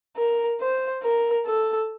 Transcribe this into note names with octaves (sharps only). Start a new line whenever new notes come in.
A#4
C5
A#4
A4